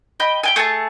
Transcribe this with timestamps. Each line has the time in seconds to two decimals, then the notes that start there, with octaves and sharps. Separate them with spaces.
0.20 D#5 G5 B5
0.43 E5 G5 G#5
0.56 A3 G#4 E5 A5